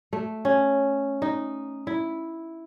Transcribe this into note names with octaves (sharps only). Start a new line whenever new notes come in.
A3
C#4
D#4
E4